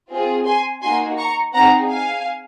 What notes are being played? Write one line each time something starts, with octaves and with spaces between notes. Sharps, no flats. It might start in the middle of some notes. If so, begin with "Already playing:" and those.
C4 F4 G#4
G#5 C6
A#3 D#4 F#4 G#5 C6
A#5 C#6
C4 D#4 G#4 F#5 A#5
F5 G#5